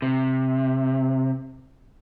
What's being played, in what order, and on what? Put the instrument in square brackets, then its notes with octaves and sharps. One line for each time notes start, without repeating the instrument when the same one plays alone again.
[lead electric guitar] C3